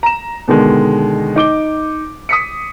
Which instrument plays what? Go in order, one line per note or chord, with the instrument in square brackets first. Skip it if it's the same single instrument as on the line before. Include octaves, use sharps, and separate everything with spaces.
[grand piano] A#5 E7
B2 D3 D#3 G#3
D#4 D6 G7
D#6 B6 C#7